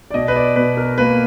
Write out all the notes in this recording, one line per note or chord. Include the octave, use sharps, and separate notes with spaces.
D5
B2 D#5
B4
D5
B2 B4
A#4
A#3 B4